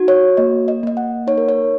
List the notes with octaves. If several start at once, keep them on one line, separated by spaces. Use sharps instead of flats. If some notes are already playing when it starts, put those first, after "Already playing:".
Already playing: D#4 F#4
C#5
A#3 D#5
D#5
A#3 D#5
F#5
D#4 C#5
A#4
C#5